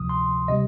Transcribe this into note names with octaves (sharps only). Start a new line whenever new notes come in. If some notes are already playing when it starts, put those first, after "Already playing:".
Already playing: D2 C3 F3 D#6
C6
C3 G3 D#5